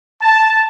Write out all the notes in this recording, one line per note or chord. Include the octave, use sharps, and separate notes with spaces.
A5